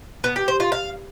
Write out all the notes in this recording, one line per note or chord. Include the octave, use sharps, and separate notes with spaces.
B3
G4
C5
F4
F5